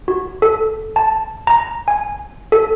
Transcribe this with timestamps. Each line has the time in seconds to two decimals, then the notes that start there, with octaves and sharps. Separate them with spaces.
0.08 F#4
0.42 A4
0.96 A5
1.47 A#5
1.88 G#5
2.52 A4